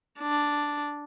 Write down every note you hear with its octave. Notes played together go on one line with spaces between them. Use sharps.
D4